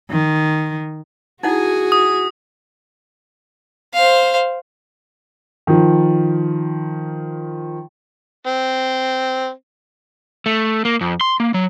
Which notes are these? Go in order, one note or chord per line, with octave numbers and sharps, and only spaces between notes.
D#3
D#4 E4 F#4 G#4 F#5 G#5
D#6
C5 F5
D#3 F3
C4
A3
A#3
F2
C6
A#3
F#3